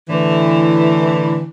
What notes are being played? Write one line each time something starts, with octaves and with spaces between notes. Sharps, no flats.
A2 D3 E3